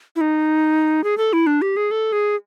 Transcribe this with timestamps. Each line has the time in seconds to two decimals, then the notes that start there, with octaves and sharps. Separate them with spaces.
0.16 E4
0.21 D#4
1.04 G#4
1.18 A4
1.33 E4
1.47 D4
1.62 G4
1.77 G#4
1.91 A4
2.12 G#4